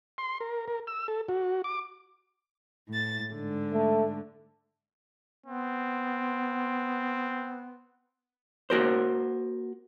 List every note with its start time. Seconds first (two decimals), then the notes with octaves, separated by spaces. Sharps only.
0.18 C6
0.41 A#4
0.68 A#4
0.87 E6
1.08 A4
1.28 F#4
1.64 D6
2.89 A2 A6
3.34 G#2 D3
3.73 A3
5.46 B3 C4
8.70 A#3 F#4 A#4 C5